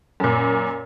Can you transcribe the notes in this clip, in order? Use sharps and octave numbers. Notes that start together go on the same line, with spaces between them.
F#2 A#2